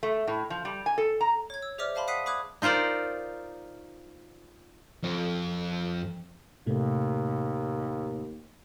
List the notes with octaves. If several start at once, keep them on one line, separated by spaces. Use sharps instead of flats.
A3
A2
F3
G3
G#5
A4
A#5
C#5 G#6
E6
G#4 C5 D5 E5 D6 F6
C5 F5 A5 B5 C6
F#5 D#6 F#6 B6 C7 D#7
B5 D6 D#6 F#6 G#6
D#4 F4 A#4 C5 D5
F2
D#2 A2 C3 A3